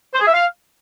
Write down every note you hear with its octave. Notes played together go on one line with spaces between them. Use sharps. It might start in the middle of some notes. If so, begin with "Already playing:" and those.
C5
G#4
E5
F5